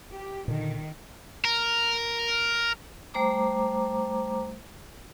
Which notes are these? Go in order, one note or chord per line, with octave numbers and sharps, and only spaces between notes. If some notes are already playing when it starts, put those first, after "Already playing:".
G4
A#2 D3 D#3
A#4
G3 A3 C5 A#5 D6